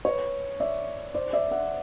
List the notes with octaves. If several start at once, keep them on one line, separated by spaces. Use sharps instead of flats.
B4 C#5
D5 E5
C5 D5
D5 E5
E5 F#5